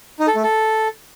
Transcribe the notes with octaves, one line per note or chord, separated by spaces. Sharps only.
D#4
A4
A3
A4